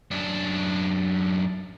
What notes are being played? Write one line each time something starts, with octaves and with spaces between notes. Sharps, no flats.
F#2 D4